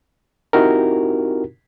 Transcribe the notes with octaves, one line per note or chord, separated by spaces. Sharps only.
C4 D#4 E4 F#4 G4 A#4